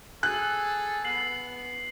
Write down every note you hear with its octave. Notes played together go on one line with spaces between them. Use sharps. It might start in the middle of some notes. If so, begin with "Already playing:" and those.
G#4 A4 F#6
B3 C7 F#7